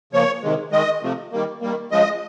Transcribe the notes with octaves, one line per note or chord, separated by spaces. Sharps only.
C#3 F3 A#3 C#5
C3 D#3 G#3
D#3 G#3 D#5
C3 F3 A3
D#3 G3 A#3
D#3 G3 A#3
C#3 F3 G#3 D#5